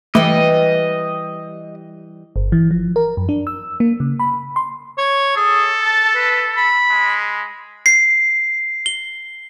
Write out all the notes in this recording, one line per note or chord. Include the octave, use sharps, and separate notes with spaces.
E3 G3 A3 D#5
G1
E3
F3
A#4
F#2
D4
E6
A#3
C#3
B5
C6
C#5
G#4 A4
A5
B4
B5
G#3
C7
G7